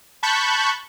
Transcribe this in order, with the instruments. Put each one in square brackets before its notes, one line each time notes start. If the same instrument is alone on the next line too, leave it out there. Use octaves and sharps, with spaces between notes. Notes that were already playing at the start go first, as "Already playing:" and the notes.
[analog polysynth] A5 B5 C#6 F#6 G6